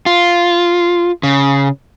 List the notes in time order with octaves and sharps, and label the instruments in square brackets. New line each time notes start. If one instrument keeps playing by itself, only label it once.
[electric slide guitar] F4
C#3